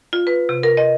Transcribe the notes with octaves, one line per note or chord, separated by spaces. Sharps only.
F4
B4
C3
A#4
D#5